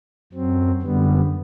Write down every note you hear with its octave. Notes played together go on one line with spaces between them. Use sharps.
F#2 F#3 C4
F#2 D3 G3 B3